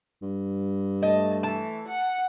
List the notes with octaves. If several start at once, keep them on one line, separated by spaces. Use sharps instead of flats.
G2
A3 D#5 A5
E3 A5
F#5